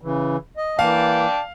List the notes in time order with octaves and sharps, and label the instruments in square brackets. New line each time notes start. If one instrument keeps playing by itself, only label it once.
[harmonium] C#3 E3
D#5
[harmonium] E3 A#3 [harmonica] D5 G5 A5 [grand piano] F5